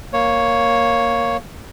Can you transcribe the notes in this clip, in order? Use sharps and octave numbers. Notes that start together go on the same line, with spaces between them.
A#3 C#5